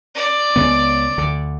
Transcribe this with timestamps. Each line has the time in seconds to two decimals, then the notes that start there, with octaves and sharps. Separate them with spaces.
0.15 D5
0.56 C#2 C#3 B3
1.18 D2 D3